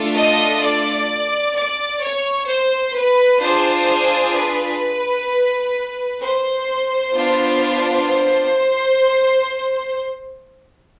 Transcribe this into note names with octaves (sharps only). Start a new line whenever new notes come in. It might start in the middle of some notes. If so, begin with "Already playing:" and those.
Already playing: A3 D4 F4 A4
D#5
D5
D5
C#5
C5
B4
D4 F4 G#4 C5
B4
C5
B3 D4 F4
C5